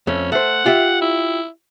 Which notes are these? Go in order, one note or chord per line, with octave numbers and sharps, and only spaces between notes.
F2 A3 C#4
A3 C5 F#5
F4 G4 E5
E4